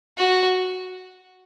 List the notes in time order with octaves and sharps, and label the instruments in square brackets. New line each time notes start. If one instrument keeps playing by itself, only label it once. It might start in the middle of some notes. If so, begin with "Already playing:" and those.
[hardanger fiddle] F#4